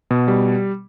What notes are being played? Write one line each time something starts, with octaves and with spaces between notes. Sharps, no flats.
B2
G3